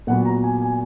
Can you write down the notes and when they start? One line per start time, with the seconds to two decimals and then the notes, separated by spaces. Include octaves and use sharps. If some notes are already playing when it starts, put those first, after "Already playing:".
0.07 A#2 F#3 B3 F#5
0.25 A#5
0.44 G#5
0.62 G#5